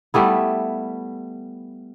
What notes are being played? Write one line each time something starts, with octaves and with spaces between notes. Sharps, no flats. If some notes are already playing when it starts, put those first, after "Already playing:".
G3 A3 B3 E4